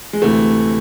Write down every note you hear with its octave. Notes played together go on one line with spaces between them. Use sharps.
G#3
D2 C3 E3 A3